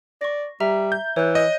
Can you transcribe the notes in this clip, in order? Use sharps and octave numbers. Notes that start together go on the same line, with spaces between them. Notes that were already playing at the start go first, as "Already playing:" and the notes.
D5 C#6 A#6
G3 E5 A#5
G6
E3 C#5 F#6
D#5